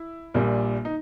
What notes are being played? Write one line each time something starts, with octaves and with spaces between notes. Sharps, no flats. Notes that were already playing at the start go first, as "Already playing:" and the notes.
Already playing: E4
A#1 A#2 G3
D#4